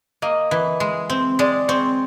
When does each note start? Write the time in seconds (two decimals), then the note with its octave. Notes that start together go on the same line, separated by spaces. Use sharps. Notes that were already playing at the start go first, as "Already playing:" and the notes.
0.22 A#3 D#5
0.51 E3
0.80 G#3
1.10 C4
1.39 G#3 D5
1.68 C4 C#5